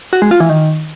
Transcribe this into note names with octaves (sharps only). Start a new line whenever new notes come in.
F#4
G#3
F4
E3
D#3